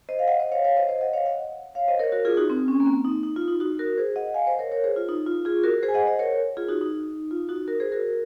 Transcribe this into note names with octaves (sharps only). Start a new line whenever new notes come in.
C5 D#5
F5
D#5 F#5
C5 D#5
C#5 F5
C#5 F5
C5 D#5
C5 D#5
D#5 F#5
C#5 F5
D#5 F#5
C#5 F5
C5 D#5
A#4 C#5
F#4 A#4
F4 G#4
D#4 F#4
C4
C#4
A#3
C4
D#4
D#4
F4
D#4
D#4 F#4
F#4 A#4
G#4 C5
D#5 F#5
F5 G#5
C5 D#5
A#4 C#5
A#4 C#5
G#4 C5
F4
D#4
F4
F4 G#4
F#4 A#4
G#4 C5
G#5
D#5 F#5
C5 D#5
A#4 C#5
F4 G#4
D#4 F#4
D#4
F4
D#4 F#4
F#4 A#4
G#4 C5
F#4 A#4